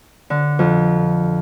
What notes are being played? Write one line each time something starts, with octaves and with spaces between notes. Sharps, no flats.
D3
F2